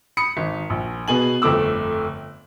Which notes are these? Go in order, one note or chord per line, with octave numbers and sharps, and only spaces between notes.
B5 D#6 C#7
G#1
A#1
B2 B3 G#4 G#5 F#7
G1 F2 A3 D6 E6